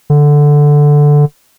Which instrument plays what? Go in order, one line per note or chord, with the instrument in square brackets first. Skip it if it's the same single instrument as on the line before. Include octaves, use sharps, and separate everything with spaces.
[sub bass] D3